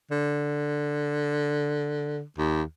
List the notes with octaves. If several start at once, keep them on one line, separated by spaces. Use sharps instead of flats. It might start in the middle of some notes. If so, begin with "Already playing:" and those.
D3
D#2